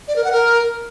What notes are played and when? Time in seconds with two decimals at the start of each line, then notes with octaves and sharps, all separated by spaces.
0.08 D5
0.16 A#4
0.24 F#5
0.32 A#4